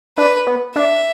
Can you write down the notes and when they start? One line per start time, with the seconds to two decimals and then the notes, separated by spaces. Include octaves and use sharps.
0.18 D4 B4
0.47 B3
0.75 D4 E5